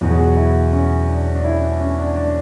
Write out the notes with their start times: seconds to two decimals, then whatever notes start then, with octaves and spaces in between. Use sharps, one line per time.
0.01 E2 B2 F#3 F#4
0.10 G#4
0.19 F#4
0.37 E4
0.73 C#4
1.09 D4
1.35 D4
1.44 E4
1.62 D4
1.80 C#4
1.98 D4
2.16 D4